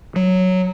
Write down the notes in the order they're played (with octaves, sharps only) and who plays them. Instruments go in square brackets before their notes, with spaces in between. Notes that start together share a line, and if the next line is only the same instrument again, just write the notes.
[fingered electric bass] F#3